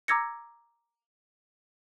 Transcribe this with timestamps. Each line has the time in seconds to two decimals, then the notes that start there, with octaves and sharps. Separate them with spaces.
0.08 A#5 D6 E6 G#6 A#6 C#7